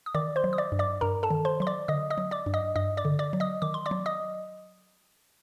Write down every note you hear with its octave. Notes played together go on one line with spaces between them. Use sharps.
D#6
D#3 D5 D6
C5 C6
F#3
D#6
D5 D6
G2
D5 D6
G2 A#4 A#5
A4 A5
D#3
C5 C6
F#3 C6
D5 D6
D3 D#5 D#6
D#5 D#6
F#3
D5 D6
G2
D#5 D#6
G2 D#5 D#6
D5 D6
D3
D5 D6
F#3
D#5 D#6
D#3 D6
C6
D5 D6
F#3
D#5 D#6